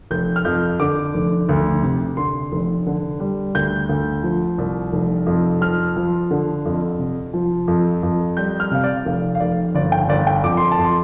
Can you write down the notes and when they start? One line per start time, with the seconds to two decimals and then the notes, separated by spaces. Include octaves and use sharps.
0.11 F1 G6
0.36 F6
0.45 F2 G6
0.80 D3 D6
1.14 F1
1.49 D2
1.83 C3
2.17 D3 C6
2.52 F1
2.86 D3
3.20 G3
3.55 D2 G6
3.89 D2
4.23 F3
4.58 C2
4.92 F1
5.27 F2
5.61 F3 F6
5.97 F3
6.31 D3
6.66 F2
6.99 C3
7.34 F3
7.68 F2
8.03 F2
8.37 G3 G6
8.60 F6
8.71 C3 F5
8.84 D5
9.06 F1 F5
9.35 F5
9.40 F1 D5
9.75 G1 D5
9.92 G5
10.09 G1 D5
10.27 G5
10.43 F2 D6
10.57 C6
10.72 A5
10.78 F2
10.85 C6